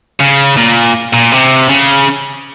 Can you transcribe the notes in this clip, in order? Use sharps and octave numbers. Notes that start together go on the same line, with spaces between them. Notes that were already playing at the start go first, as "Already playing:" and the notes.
C#3
A#2
A#2
C3
C#3